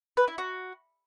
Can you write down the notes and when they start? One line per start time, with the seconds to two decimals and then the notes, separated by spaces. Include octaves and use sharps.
0.17 B4
0.28 E4
0.38 F#4